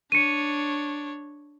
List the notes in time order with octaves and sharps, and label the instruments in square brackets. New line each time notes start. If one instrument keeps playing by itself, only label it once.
[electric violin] D4 C#5 [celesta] C#7 D#7